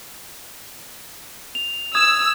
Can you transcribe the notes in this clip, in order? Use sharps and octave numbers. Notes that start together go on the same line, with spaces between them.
F7
D#6 E6 G#6